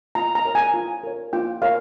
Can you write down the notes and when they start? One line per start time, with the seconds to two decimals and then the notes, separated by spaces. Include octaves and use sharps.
0.15 F4 A#5
0.35 A#5
0.45 A#4 C#5
0.55 G#5
0.74 F4
1.03 A#4 C#5
1.33 F4 G5
1.62 A#4 C#5 F5